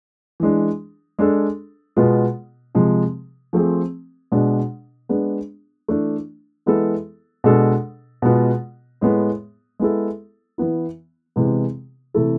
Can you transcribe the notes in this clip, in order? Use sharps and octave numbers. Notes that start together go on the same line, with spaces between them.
E3 G#3 D4
G#3 D4 A4
B2 G#3 B3 F4
C3 F3 G#3
F3 A3 C4 G#4
B2 G#3 D4
G#3 B3 D4 G#4
E3 A3 D4
E3 G#3 B3 E4 A4
B2 G#3 D4 A4
B2 G#3 B3 F4
A2 G#3 B3
G#3 B3 E4 A4
E3 B3 E4
C3 E3 G#3 B3
C3 E3 A3 E4 A4